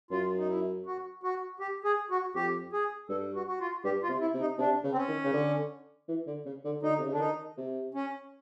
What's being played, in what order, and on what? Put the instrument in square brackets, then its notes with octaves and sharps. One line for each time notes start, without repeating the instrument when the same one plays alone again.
[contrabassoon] F#2 [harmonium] F4
[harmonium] D#4
E4
F#4
F#4
G4
G#4
F#4
[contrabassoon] F2 [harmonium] G4
[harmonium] G#4
[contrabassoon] G2 [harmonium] A4
[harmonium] F#4
F#4
F4
[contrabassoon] G2 [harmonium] G4
[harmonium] F4
[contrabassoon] C3
[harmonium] E4
[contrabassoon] C3
[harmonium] D#4
[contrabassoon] C3 [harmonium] D4
[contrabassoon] C#3
[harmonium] C4
C#4
[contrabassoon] D#3
C#3
D3
E3
D3
C#3
D3
[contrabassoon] D3 [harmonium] D#4
[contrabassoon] C3
C#3
[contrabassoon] D3 [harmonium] D4
[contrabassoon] D#3 [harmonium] D#4
[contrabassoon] C3
[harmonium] C#4